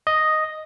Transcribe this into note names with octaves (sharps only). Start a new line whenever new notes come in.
D#5